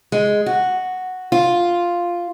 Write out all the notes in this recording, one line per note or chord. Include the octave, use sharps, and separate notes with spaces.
G#3
F#4
F4